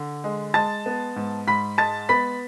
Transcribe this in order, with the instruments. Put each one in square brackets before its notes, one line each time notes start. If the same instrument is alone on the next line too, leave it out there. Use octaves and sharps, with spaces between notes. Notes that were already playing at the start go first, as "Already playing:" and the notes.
Already playing: [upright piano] D3
G#3
G#3 A5 A6
B3
G#2
G#2 B5 B6
G#3 A5 A6
B3 B5 B6